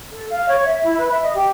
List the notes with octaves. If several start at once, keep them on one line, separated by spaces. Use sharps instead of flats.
A4
F5
C#5
E5
E4
B4
E5
D#5
G4